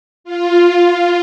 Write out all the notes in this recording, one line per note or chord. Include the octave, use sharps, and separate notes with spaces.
F4